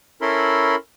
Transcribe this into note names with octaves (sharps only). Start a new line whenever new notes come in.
C#4 E4 A4 A#4 B5 C6